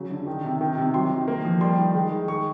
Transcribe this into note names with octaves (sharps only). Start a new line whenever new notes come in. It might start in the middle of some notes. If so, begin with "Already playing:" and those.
Already playing: C#3 F#3
D3
D#3
C3
D#3
C3
F#3 C6
D#3
A#3
F3
G3 C6
D#3
G#3
D#3
G#3 C#6